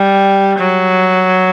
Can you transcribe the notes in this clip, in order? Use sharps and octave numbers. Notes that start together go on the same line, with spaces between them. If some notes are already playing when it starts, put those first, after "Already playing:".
Already playing: G3
F#3